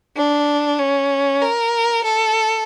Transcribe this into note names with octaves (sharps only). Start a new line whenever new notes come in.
D4
C#4
A#4
A4